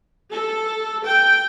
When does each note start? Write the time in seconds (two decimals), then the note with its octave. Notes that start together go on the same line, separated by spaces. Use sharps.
0.32 A4
1.06 G5